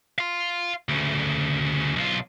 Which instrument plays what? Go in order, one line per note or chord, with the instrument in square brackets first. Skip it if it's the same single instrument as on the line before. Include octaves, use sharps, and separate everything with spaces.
[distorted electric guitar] F5 C6
D2 C#3
B1 F4